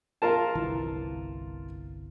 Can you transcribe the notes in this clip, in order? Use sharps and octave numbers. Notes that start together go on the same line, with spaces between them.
F4 A#4 A5
G1 C2 E3